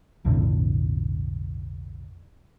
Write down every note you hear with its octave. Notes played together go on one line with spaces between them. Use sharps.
B1 F2 A2 D3